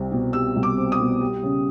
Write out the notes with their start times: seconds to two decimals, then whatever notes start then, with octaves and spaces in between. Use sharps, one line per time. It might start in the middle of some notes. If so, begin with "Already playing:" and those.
Already playing: C2 G3 C4
0.12 B2
0.33 G3 E6
0.56 C2
0.63 D6
0.77 C4
0.92 D#6
0.99 B2
1.21 G3
1.43 C#3